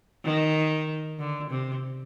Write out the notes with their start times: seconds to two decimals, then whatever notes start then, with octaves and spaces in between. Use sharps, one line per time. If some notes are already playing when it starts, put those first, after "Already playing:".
0.24 D#3
1.19 D3
1.50 C3